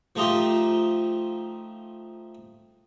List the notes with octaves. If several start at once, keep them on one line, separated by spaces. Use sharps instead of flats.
F3 A3 D#4 F4 G4